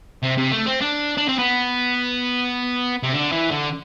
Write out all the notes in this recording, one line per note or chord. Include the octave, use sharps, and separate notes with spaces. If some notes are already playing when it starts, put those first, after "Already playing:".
C3
C3
A3
C4
D4
D4
C4
B3
C3
D3
E3
D3